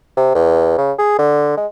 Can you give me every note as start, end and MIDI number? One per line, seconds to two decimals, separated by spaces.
0.17 0.31 48
0.35 0.74 40
0.78 0.93 49
0.99 1.14 68
1.19 1.56 50
1.57 1.67 56